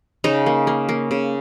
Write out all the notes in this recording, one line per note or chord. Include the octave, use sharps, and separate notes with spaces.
C#3 D#4
A#3
A#3
A#3
C#3